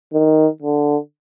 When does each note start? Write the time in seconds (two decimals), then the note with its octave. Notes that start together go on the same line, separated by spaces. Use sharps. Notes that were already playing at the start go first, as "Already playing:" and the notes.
0.13 D#3
0.62 D3